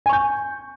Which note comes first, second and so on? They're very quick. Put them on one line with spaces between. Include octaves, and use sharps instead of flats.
G#5 C#6 G6